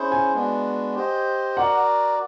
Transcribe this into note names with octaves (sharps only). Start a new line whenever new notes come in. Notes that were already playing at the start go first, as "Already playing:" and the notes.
Already playing: C#4 E4 G#4 C5
G#5
G#3 B3 D4 F#4
G4 C5 D#5
F#4 A#4 D5 F#5